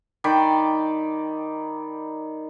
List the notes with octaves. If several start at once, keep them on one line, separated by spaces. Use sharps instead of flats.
D#3 D5 G5 B5